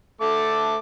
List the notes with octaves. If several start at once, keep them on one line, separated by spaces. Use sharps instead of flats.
A3 A4 D6